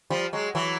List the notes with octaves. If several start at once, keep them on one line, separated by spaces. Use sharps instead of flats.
F3 G3
F#3 G#3
E3 F#3